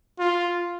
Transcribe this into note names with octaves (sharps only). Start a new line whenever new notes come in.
F4